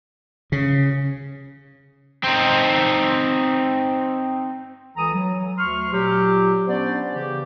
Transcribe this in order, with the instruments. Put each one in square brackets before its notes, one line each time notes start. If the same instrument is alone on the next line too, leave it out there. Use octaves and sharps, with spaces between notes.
[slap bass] C#3
[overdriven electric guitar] C4 D#4
[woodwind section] C#2 E3 A4 A#5 D#6
F#3
D2 C6 C#6 F6
A#2 F#3 G4
B3 C#4 D4 C5 D5
C#3 E3 G4